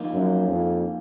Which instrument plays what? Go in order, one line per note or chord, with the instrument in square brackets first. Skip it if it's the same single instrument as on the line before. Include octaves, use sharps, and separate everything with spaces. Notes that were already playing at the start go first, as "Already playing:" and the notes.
Already playing: [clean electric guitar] F3 A#3 D#4
[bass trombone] F#2
F2